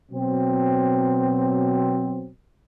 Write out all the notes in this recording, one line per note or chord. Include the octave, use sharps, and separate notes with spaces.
B2 F#3 C4